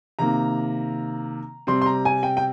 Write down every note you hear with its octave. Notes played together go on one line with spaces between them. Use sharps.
C3 D#3 A#3 A#5
C3 G3 C4 C6
C6
A#5
G#5
G5
G5